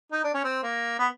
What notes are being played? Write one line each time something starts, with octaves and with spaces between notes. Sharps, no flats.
D#4
D4
C#4
C4
A#3
B3